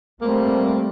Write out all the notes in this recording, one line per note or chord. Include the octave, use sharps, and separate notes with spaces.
G3 A3 A#3 C4